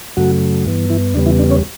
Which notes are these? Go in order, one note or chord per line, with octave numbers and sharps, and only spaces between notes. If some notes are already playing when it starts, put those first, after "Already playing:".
F#2 C#3 F#3 A3 F#4
G2 E3 B3
E3 E4
E2 C#3 G3 B3 D4
E3 E4
D4
C#4 C#5